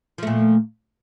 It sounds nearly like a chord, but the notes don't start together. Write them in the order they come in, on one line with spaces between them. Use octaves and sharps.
F3 A3 A#2